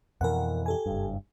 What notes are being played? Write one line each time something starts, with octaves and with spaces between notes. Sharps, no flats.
F2 B2 E3 A#4 F#5
G4 A4 G#5
F#1 G2